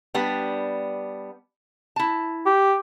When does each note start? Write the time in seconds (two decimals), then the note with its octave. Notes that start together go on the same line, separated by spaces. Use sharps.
0.15 G3 B3 D4
1.96 E4 A5
2.46 G4